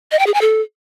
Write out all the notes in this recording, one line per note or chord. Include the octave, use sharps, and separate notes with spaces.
D#5
G5
G#4
G#5
A4